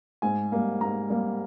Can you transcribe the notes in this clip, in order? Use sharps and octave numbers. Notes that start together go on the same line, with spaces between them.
G#2 G#5
G3 A#3
G#2 A#5
G3 A#3